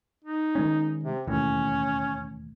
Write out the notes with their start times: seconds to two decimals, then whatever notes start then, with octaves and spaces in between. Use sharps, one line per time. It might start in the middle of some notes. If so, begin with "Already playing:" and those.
0.25 D#4
0.55 D#3 G#3 C#4
1.04 C3
1.27 E1 D#2 A2 C#4